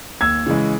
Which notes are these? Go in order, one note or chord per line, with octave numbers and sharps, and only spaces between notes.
D#2 E6 G#6
C#3 E3 G#3